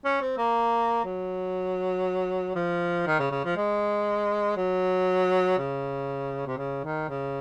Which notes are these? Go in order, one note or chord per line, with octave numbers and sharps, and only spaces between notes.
C#4
C4
A#3
F#3
F3
D#3
C#3
C#3
F3
G#3
F#3
C#3
C3
C#3
D#3
C#3